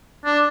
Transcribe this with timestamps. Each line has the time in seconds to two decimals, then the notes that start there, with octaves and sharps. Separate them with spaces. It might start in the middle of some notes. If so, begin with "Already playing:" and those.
0.25 D4